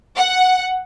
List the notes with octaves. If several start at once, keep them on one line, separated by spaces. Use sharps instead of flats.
F#5